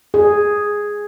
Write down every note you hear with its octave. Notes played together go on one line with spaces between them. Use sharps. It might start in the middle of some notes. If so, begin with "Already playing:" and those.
G#4